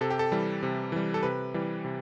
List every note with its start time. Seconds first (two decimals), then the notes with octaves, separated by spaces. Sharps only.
0.01 C3 A4
0.10 G4
0.19 A4
0.32 E3 G3
0.63 C3
0.92 E3 G3
1.14 A4
1.23 C3 B4
1.54 E3 G3
1.85 C3